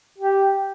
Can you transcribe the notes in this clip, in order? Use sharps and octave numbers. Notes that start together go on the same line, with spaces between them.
G4